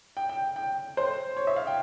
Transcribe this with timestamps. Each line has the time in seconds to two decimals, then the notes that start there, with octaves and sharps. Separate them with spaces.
0.17 G5
0.29 G5
0.56 G5
0.97 C5
1.37 C#5
1.47 E5
1.56 F5
1.67 G5